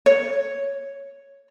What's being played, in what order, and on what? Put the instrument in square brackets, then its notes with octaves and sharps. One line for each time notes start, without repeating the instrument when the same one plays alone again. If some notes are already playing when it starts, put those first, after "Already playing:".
[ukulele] C#5